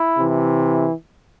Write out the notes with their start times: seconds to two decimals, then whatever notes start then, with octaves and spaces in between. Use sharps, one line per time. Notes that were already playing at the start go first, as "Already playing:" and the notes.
Already playing: E4
0.18 C3 E3